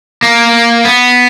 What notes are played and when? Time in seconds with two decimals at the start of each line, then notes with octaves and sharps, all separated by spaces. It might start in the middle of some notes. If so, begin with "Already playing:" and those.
0.23 A#3
0.85 B3